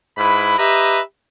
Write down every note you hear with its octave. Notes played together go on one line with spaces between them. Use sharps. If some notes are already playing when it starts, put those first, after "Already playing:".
G#2 E4 B4 B5
G4 B4 D#5 E5 A#5